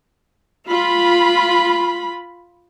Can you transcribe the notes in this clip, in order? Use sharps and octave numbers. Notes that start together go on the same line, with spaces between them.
F4 B5